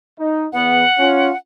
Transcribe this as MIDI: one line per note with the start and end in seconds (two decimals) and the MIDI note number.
0.18 0.45 63
0.53 0.83 40
0.53 0.83 59
0.53 1.37 78
0.98 1.30 61
0.98 1.30 65